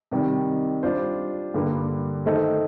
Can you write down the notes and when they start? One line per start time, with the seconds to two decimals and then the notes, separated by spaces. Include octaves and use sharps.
0.11 C3 D#3 G3
0.83 G3 D4 F4 C5
1.54 G2 D3 G3 A#3
2.26 D#3 A3 D#4 A4 C5